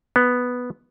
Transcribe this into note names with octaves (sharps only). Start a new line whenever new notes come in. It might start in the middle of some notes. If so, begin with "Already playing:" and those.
B3